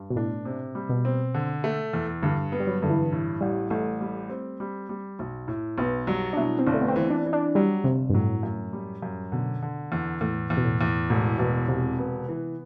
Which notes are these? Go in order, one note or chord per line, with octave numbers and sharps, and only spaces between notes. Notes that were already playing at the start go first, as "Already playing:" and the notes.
Already playing: G2
B2
A2 D4
C3
G3
B2
C4
D3
A3
E2
G2 D3
B3
G3
F#3
G2 D3
E3
A2
A1 G3
A1 A3
G3
C4
G3
G3
B1
A2
B1 B3
F#3 G3
D4
B2 E4
C4
G1 D4
A3
B3
C4
E3
D4
E3
D4
F#3 G3
G1 C3
G2
A2 F#3
F#2
G3
F#2
B2 D3
D3
E2
E2 A2
E2
B2
A2
E2
E1 A2
E2 B2
E1 C3
B3
E3